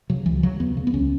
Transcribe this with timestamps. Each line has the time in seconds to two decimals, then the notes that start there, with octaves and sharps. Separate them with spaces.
0.10 C#3 F#3
0.26 C#2 E3
0.43 C#3 F#3
0.60 D#2 B3
0.77 C#3
0.87 B3
0.94 C#2 C#4